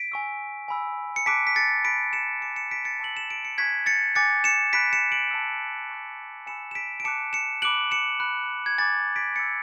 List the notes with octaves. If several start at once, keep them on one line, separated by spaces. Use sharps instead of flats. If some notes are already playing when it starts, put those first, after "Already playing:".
Already playing: B6 D7
G#5 C#6 E6
G#5 B5 E6
C#7
A5 D6 F#6 B6 D7
B6
A6 C#7
B5 D6 F#6 B6 D7
C#7 E7
G#5 D6 F#6 C#7 E7
C#7 E7
B6 D7
A6 C#7
A5 C#6 E6 F#7
E7
D7
C#7
G#5 C#6 F#6 G#6 B6
A6 C#7
G#5 D6 F#6 A6 C#7
C#7 E7
B5 F#6 B6 D7
C#7 E7
D7 F#7
A5 E6
A5 C#6 F#6
G#5 B5 E6 C#7 E7
E7
B6 D7
D7
A5 D6 F#6 C#7 E7
C#7 E7
B5 D6 F#6 D7 F#7
C#7 E7
B5 F#6
G#6
G#5 B5 D6 F#6 A6
B6 D7
G#5 B5 E6 A6 C#7